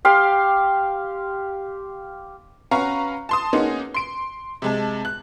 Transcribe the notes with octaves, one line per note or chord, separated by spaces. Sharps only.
G4 F5 C6
C#4 F#4 B4 F5 A#5 C#6
A5 C6 D#6
A#3 B3 C#4 D#4 F#4 G#4
C6 D7
C3 G#3 A5
F#6